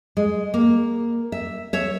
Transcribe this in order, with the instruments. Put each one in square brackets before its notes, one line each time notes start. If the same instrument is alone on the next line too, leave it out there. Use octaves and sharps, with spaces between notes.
[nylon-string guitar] G#3
A#3
E5
C#5 E5